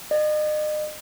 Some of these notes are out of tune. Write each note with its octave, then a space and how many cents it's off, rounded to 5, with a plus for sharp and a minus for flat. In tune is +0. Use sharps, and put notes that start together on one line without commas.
D#5 -40